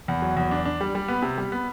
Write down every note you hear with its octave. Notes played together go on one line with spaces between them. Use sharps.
E2
F#3
E2
D4
D4
G3
G3
B3
C3
G3
B3